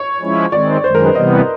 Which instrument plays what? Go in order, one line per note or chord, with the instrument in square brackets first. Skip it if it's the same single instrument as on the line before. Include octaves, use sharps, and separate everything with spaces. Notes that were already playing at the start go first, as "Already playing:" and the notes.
Already playing: [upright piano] C#5
[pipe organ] F3 G#3 C#4 E4
[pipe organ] D#3 G#3 C4 [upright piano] D5
[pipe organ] F#2 D#3 G#3 [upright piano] C5
[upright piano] A#4
B4
[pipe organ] C3 E3 G3 B3 [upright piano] D#5